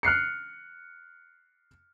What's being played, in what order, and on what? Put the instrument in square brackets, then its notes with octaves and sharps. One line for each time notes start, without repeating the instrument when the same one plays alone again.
[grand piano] F6 F#6 C7 C#7